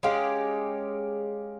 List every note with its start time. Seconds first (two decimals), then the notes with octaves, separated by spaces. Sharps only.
0.03 G#3 C#4 G4 F5